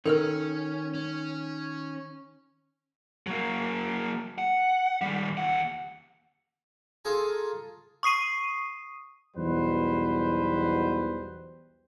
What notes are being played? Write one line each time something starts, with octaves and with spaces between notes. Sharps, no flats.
D#3 C#4 A4 A#4 F6
C#4
F#3 A#3
F#5
D#3 G3
D#2 F#5
F4 G#4 A4 G#5 A#5
C#6 D#6 C7 D#7
B1 E2 B2 G3 B4 C5